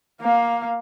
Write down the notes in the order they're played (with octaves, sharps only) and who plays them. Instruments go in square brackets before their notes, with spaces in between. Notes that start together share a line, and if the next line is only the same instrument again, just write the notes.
[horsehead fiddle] A#3 F5